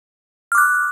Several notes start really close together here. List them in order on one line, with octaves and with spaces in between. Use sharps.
F6 D6 F#6